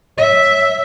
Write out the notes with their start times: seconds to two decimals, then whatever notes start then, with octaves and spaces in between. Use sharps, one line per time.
0.18 C#5 E5